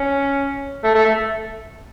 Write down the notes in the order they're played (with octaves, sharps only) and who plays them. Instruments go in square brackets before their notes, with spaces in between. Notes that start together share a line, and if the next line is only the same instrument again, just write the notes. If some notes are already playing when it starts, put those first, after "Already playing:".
Already playing: [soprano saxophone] C#4
A3
A3
A3